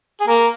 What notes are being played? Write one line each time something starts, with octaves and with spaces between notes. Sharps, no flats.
G#4
A#3 A#4